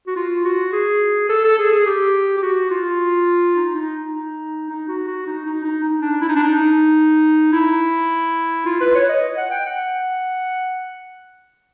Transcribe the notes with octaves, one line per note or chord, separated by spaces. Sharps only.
F#4
F4
F#4
G#4
A4
A4
G#4
G#4
G4
G4
F#4
F4
D#4
D#4
D#4
D#4
F#4
F#4
D#4
D#4
D#4
D#4
D4
E4
D#4
D4
D#4
E4
F4
B4
C#5
D#5
F#5
G5
F#5